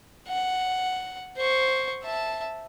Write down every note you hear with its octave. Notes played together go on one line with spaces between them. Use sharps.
F#5
C5 C#6
E5 A5